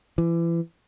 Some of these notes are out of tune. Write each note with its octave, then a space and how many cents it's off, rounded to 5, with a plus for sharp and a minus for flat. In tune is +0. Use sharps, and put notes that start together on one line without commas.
E3 +30